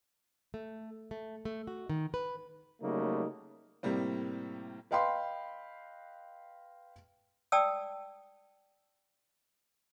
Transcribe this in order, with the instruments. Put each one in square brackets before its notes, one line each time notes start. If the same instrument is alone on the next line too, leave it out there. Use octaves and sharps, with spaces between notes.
[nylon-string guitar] A3
A3
A3
F#4
D#3
B4
[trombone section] C#3 F#3 G3 A3 A#3 D#4
[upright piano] A2 C3 G3 A#3 C4
[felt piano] B4 D#5 F5 G5 B5 C6
[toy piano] D5 G5 A5 D#6 E6